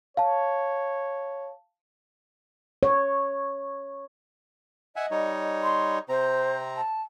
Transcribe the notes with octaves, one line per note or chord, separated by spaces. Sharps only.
C#5 F5 A5
C#5
D#5 E5 F#5 G#5
G3 D#4 C#5
C6
C3 C4 C5 A#5
A5